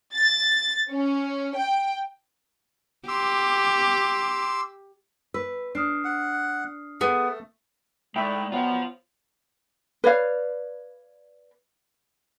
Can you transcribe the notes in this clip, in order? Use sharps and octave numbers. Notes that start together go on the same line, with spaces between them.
A6
C#4
G5
G4 C6 D6 E6
B4 E6
D4 D#6 F6 C7
F#5
A3 B3 G#4
G#2 A3 E4 D5 E5 G5
F#3 B3 F4 C5
B4 C#5 D5 F5